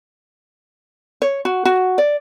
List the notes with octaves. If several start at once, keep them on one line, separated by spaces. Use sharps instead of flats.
C#5
F#4
F#4
D5